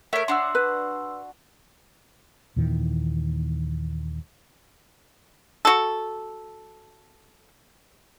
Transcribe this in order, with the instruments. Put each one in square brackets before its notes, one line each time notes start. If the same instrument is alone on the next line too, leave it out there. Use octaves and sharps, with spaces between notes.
[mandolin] A3 A#4 [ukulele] C#5 E5
[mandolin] D4 F#4 [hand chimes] C6 E6
[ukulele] B4
[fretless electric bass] D#2 A#2 D#3 E3
[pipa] F#4 A4